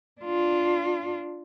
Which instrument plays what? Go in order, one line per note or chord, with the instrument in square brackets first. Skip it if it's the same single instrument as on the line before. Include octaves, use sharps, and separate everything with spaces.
[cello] D4 F4